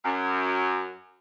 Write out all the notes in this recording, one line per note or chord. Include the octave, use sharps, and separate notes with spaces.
F#2